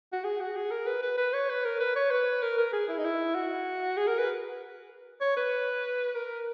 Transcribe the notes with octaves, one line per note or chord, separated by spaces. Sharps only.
F#4
G#4
F#4
G#4
A#4
B4
B4
B4
C#5
B4
A#4
B4
C#5
B4
A#4
A#4
G#4
E4
D#4
E4
F#4
G#4
A#4
B4
C#5
B4
A#4